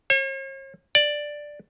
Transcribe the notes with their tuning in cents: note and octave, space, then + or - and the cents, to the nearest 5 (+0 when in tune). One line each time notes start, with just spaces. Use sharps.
C#5 -45
D5 +5